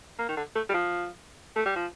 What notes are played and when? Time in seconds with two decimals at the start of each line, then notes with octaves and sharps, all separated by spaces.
0.19 A#3
0.29 D#3
0.37 D3
0.55 A3
0.69 G3
0.74 F3
1.56 A3
1.66 G3
1.76 F3